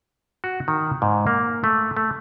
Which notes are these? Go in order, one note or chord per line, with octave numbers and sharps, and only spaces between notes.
F#4
D#3
G#2
A#3
A3
A3